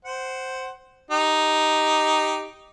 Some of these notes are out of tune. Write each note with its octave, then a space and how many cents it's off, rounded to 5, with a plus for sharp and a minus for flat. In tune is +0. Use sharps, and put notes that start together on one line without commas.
C5 +0 F#5 +20
D#4 +0 G4 +0